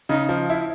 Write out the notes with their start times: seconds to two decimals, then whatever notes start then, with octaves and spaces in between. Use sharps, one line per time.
0.09 C#3 D#4
0.29 F3
0.50 E4